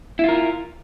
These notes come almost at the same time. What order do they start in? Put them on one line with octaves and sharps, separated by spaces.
E4 F4 A#4